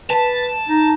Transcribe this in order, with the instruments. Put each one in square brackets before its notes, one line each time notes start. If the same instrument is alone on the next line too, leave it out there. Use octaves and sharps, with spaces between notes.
[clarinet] B4 [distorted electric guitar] A5
[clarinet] D#4